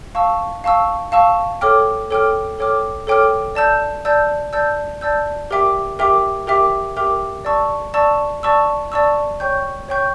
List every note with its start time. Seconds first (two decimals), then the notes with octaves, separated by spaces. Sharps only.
0.15 F5 A5 C#6 E6
0.64 F5 A5 C#6 E6
1.12 F5 A5 C#6 E6
1.61 A4 C#5 G5 D6 F6
2.11 A4 C#5 G5 D6 F6
2.59 A4 C#5 G5 D6 F6
3.07 A4 C#5 G5 D6 F6
3.55 D5 A5 E6 G6
4.05 D5 A5 E6 G6
4.53 D5 A5 E6 G6
5.01 D5 A5 E6 G6
5.51 G4 A#4 E5 G5 D6
5.99 G4 A#4 E5 G5 D6
6.47 G4 A#4 E5 G5 D6
6.97 G4 A#4 E5 G5 D6
7.45 D5 A5 C#6 E6
7.94 D5 A5 C#6 E6
8.43 D5 A5 C#6 E6
8.92 D5 A5 C#6 E6
9.40 C#5 G5 C#6 G6
9.88 C#5 G5 C#6 G6